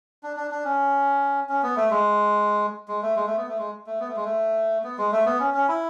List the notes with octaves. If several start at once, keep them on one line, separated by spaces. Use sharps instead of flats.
D4
D4
D4
C#4
C#4
B3
A3
G#3
G#3
A3
G#3
A3
B3
A3
G#3
A3
B3
A3
G#3
A3
B3
G#3
A3
B3
C#4
C#4
E4